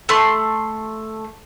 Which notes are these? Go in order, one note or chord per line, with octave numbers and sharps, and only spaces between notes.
A3 C6